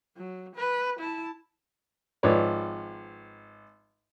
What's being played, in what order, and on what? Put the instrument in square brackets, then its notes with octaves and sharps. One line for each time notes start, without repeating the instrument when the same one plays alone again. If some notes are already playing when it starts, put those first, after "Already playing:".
[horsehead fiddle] F#3
B4
E4 A5
[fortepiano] G#1 F3 B4 C#5 D5